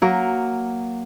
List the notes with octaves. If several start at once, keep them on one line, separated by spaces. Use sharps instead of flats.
F#3 A#3 A#4